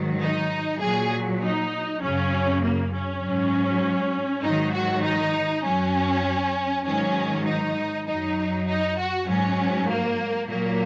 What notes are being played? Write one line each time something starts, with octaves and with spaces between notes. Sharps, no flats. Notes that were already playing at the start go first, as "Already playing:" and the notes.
Already playing: G#2 D#3 F#3
D#4
A#2 F#3 G#4
D#4
F#2 C#3 F#3 C#4
A#3
C#4
G#2 F#3
G#2 D#3 F#3 D#4
F#4
D#4
F#2 F#3 C#4
G#2 D#3 F#3 C#4
D#4
F#2 F#3 D#4
D#4
F#4
G#2 F#3 C#4
A#3
A#2 F#3 A#3